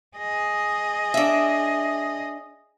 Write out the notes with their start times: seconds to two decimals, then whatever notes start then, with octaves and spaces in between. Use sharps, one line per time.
0.17 G#4 D#5
1.14 D4 E5